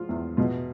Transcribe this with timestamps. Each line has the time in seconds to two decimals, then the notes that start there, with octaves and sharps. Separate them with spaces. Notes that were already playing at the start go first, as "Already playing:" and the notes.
Already playing: F3 F4
0.09 E2
0.37 B2 F4